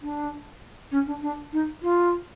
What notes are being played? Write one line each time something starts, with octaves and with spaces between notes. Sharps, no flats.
D4
C#4
D4
D4
D#4
F4